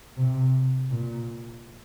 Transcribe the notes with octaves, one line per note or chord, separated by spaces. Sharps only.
C3
A#2